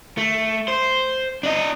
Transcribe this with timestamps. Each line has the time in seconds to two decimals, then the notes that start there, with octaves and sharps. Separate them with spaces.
0.18 A3
0.68 C5
1.43 D4 D#5